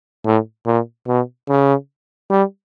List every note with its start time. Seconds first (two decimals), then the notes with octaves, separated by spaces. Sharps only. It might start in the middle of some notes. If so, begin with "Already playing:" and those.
0.25 A2
0.66 A#2
1.08 B2
1.49 C#3
2.31 G3